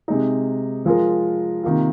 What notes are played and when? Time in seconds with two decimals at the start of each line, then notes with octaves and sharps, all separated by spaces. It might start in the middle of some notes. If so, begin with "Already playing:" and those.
0.08 C3 G#3 D#4
0.86 F3 G#3 F4 A#4
1.63 C3 D#3 A#3 F4